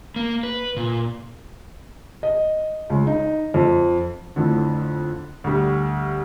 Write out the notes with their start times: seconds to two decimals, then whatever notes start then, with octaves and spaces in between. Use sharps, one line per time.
0.16 A#3
0.43 B4
0.77 A#2
2.23 D#5
2.90 C#2
3.07 D#4
3.54 F2
4.36 F2 A2 D3
5.44 D2 G3